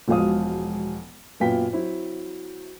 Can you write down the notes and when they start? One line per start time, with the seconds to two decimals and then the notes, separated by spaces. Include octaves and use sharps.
0.08 E1 B2 F3 G#3 F5 D#6
1.40 F#2 A#2 B3 F4 G5 B6
1.73 F#3 C4 E4